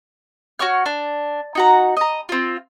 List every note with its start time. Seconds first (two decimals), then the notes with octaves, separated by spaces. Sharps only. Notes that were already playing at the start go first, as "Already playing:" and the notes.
0.59 F#4 C#5 C#6 F6
0.86 D4
1.55 D#4 F#4 A#5
1.97 D#5 A#5
2.29 C4 F4